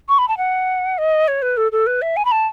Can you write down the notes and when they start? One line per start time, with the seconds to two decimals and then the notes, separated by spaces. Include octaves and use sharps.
0.09 C#6
0.18 B5
0.28 A5
0.37 F#5
0.98 D#5
1.28 C#5
1.42 B4
1.57 A4
1.72 A4
1.87 B4
2.02 E5
2.16 G#5
2.25 B5
2.32 A5